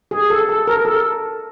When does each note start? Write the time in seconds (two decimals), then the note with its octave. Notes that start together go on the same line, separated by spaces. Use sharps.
0.11 G#4
0.30 A4
0.49 A4
0.67 A#4
0.85 A4